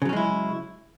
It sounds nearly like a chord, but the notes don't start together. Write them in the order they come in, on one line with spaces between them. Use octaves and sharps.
C#3 F#3 C#4 G#3 E4